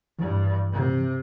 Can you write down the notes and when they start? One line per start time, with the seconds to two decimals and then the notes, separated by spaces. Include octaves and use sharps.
0.19 G2 E3
0.72 C3